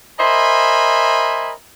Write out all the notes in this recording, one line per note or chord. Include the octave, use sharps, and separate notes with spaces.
A#4 C5 D#5 E5 G#5 B5